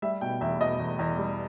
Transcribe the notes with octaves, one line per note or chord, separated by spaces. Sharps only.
G3 E5
B2 G5
E2 E5
B2 D#5
E2
E2
G3